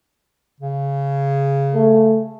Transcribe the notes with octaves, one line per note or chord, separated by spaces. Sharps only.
C#3
A3